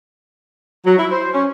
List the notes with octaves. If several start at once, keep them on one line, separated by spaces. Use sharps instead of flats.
F#3
E4
C5
C#4